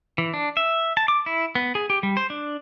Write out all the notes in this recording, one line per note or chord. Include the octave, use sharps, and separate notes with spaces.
E3
D4
E5
A5
D6
E4
B3
G#4
G4
G3
C5
D4